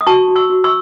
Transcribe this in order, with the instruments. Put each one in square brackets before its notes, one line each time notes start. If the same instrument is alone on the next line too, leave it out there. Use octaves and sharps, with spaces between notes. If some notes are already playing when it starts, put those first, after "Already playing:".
[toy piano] D#6
F#4 A5 C#6
F#4
C#6 E6
F#4
C#6 E6